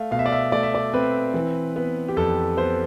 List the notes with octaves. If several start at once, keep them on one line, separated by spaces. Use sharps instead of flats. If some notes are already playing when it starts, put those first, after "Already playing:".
Already playing: A3 F5
B2 F5
E5
D5
E5
A3 D5
E5
D5
C4 B4
E3
B3
G4
F2 A4
B3 C5